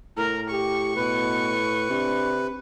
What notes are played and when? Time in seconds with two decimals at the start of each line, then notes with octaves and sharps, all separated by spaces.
0.17 A2 A#4
0.51 G4 C#6
0.96 B2 B4
1.90 C3 D4